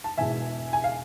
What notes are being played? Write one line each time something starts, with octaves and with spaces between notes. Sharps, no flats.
A5
E1 E2 B2 G#3 E5 G#5
G#5
F5